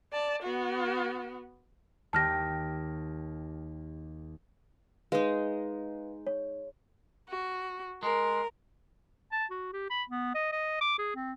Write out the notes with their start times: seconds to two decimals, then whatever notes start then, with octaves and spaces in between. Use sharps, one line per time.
0.12 D5 A5
0.43 B3 F#4
2.13 D#2 G4 A5 F6 A#6
5.12 G#3 D#4 B4 F5
6.27 C#5
7.29 F#4
8.03 G#3 A#4
9.32 A5
9.51 F#4
9.73 G4
9.90 B5
10.09 B3
10.35 D#5
10.52 D#5
10.81 D6
10.98 G#4
11.15 C4